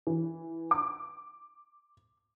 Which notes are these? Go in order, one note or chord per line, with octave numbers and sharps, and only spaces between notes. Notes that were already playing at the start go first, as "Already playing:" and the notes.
E3
D6